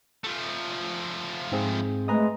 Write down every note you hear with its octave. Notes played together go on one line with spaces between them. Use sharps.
F3 A3
G#2 C4 G#4
G#3 A3 B4 A#5 D#6